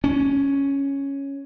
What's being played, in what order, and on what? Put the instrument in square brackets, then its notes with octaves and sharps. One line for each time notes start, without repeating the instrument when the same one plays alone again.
[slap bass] C#4